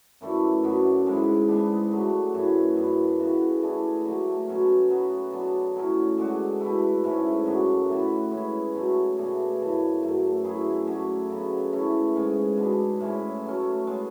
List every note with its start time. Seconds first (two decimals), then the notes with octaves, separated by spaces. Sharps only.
0.21 F#2 E3 A3 D4
0.63 F#2 D3 F#3 B3
1.06 G#2 E3 G#3
1.48 E3 G#3 B3 D4
1.91 D3 F#3 A3
2.34 F#2 E3 A3 C#4
2.77 F#2 E3 B3 D4
3.19 C#3 E3 B3 F#4
3.62 E3 A3 D4 G#4
4.05 D3 F#3 A3
4.48 B2 F#3 C#4
4.90 F#3 B3 F#4
5.32 F#3 B3 D4
5.76 A2 F#3 C#4
6.18 D3 G#3 D4 F#4
6.61 B2 A3 E4
7.04 G#2 E3 A3 C#4
7.46 F#2 D3 F#3 B3
7.89 A2 E3 B3 F#4
8.31 E3 G#3 C#4 E4
8.75 B2 F#3 A3
9.17 B2 A3 D4 G#4
9.59 F#2 C#3 E3
10.03 F#2 D3 F#3 A3
10.44 F#3 A3 E4 G#4
10.87 D3 F#3 A3 C#4
11.30 C#3 F#3 B3
11.73 E3 A3 C#4
12.16 G#2 G#3 C#4 G#4
12.58 B2 G#3 D4
13.01 A2 E3 G#3 C#4
13.44 F#3 A3 C#4
13.87 G#3 B3